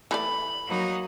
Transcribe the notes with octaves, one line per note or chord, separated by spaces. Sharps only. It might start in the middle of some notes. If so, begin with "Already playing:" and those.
E3 A3 D5 B5
F#3 A#3 D#4